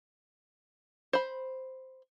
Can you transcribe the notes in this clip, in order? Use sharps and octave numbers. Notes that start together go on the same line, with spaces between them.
C5 B5